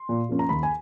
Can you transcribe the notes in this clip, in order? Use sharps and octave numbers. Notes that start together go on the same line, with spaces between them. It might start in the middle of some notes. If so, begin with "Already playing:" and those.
Already playing: C6
A#2
F3 A#3 C#4
A#5
D#2 B5
G#5